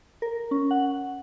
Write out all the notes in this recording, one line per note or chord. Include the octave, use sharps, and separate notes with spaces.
A#4
C#4
F#5